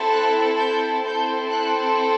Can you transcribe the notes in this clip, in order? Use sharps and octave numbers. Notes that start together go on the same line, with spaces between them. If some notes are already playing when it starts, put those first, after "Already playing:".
Already playing: C4 E4 A4
F#6
G6
C4 E4 A4 G6
F#6